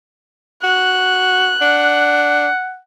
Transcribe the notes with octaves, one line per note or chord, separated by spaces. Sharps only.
F#4 F#6
D4 F#5